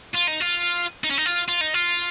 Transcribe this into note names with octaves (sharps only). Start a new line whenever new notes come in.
F4
D#4
F4
D#4
C#4
D#4
F4
F4
D#4
F4